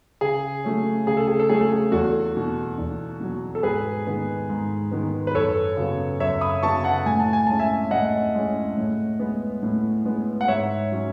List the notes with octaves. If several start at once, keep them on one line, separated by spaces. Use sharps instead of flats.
C#3 G#4
F#3 A3 C#4
C#3 G#4
A4
G#4
A4
F#3 A3 C#4 G#4
A4
G#4
E2 F#4 A4
B2 F#3
E2
B2 F#3
A4
G#2 G#4 B4
D#3 G#3 B3
G#2
D#3 G#3 B3
B4
F#2 A4 C#5
C#3 F#3 B3
F#2 C#5 E5
B5 D#6
C#3 F#3 B3 A5 C#6
F#5 A5
A2 G#5
A5
G#5
G#3 C#4 A5
E5 G#5
A2 D#5 F#5
G#3 C#4
A2
G#3 B3
A2
G#3 B3
F#5
G#2 C#5 E5
F#3 C#4